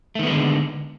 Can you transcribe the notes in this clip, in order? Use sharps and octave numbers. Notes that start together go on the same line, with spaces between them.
D3 D#3 G#3 A3 B3